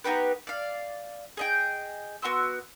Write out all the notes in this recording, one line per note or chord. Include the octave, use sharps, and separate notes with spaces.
B3 D#4 G4 B4
D5 F5
G#4 D#5 G5
B3 F#4 C6 E6